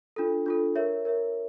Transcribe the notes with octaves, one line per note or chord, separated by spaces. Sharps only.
D4 F4 A4
D4 F4 A4
A#4 C#5 E5
A#4 C#5 E5